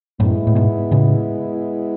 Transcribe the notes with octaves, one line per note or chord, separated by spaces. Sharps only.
F#2 A2 G#3 B3 E4
A2
G#2 B2
A2 C#3